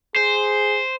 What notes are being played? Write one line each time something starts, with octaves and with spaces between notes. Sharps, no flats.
G#4 C5